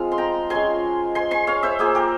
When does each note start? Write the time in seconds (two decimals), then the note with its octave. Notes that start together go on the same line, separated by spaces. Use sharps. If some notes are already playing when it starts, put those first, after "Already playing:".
Already playing: F3 G#3 C4 F4 F5
0.12 C6
0.18 G5 A#5
0.50 G#3 C#4 F4 G#5 C6
1.15 G#5 C6
1.31 G#5 C6
1.47 C#5 F5
1.63 C5 E5
1.79 A#3 F4 G#4 C5
1.95 G4 A#4